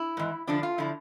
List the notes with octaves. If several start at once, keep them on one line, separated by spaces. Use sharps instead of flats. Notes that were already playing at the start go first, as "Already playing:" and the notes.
Already playing: E4
G#2 E3
E2 D3 F3 D4
F4
D3 F3 E4